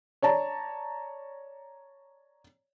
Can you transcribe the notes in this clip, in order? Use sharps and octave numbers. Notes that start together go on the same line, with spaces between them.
C#5 D5 A5 A#5